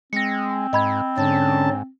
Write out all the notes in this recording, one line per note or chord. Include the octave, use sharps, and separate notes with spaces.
G#3 C4 A#6 C#7
G#2 D#5 B5 G#6
G#2 D3 C#4 A5